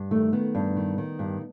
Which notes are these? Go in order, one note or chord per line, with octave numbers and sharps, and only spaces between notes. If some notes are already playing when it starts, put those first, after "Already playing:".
Already playing: G2
D#3 A3
D#3 B3
G2
D#3
D#3
G2